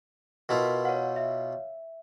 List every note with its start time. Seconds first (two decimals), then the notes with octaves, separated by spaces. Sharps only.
0.49 B2 E4 F4 A#4 B4
0.85 C#5 F5 F#5
1.16 E5